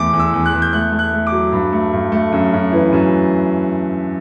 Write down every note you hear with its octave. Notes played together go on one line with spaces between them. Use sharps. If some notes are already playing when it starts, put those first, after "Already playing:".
Already playing: E2 A3 D6
E2
E6
E2
F#6
E2
G6
A3 F#6
A3
F#6
A3
D6
F#3
G2
A3
G2
A3
F#2
F#2
E3
F#2